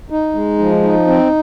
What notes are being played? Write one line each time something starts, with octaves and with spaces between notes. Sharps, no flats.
D#4
G#3
F3
D#4
C4